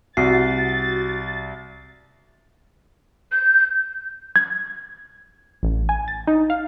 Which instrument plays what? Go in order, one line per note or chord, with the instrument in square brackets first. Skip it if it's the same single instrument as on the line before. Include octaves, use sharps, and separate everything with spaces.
[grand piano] C2 [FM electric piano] F#4 [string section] A6 [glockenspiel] C7
[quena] G6
[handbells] G#6
[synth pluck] A1
G#5
A6
D#4
F5